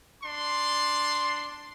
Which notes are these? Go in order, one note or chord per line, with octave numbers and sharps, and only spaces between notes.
D4 C6